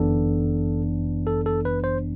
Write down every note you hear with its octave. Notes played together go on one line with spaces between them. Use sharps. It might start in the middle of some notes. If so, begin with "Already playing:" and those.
Already playing: G1 F#2 E3 B3 D4 A4
A4
A4
B4
C5